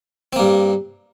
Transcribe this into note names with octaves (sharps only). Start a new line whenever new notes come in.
G2 A#3 C4